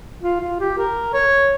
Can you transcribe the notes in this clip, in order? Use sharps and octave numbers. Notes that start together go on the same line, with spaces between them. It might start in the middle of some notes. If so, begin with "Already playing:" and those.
F4
F4
G4
A#4
C#5